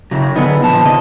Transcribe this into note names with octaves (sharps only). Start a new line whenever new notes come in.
C#3 F#3
D3 B3 D#4 G#4
A#2 F3 A5
C3 D#5